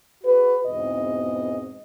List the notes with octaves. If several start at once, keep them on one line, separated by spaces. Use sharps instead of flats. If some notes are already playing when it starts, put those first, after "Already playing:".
F#4 G#4 B4
E2 G#2 B2 C4 D#5